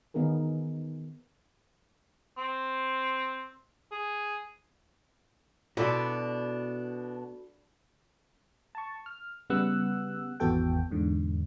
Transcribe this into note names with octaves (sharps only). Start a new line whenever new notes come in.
D#3 B3 D#4 G#4 A#4
C4
G#4
B2 D4 E4 F#4 A4 B4 D5 C6
A5 C#6
F6
C#3 G3 B3 F#5 E6 F#6
G#1 E2 B3 F#4 A4 G5
E2 G#2 D3